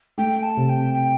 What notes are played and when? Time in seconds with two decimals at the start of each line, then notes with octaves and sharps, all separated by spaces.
0.18 A3 G5
0.43 A5
0.57 C3
0.69 G5
0.94 G5